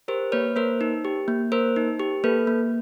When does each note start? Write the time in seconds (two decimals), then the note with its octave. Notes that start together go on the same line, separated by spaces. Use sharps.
0.08 G4 A#4 C5
0.32 A#3 B4 C#5
0.56 A#3 A#4 C5
0.81 D#4
1.05 G4
1.28 A#3
1.52 A#3 A#4 C5
1.76 D#4
1.99 G4
2.24 A#3 A4 B4
2.47 A#3